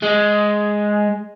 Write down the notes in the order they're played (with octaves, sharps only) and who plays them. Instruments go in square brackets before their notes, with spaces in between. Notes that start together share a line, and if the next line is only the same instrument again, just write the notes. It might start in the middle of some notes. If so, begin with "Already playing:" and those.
[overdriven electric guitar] G#3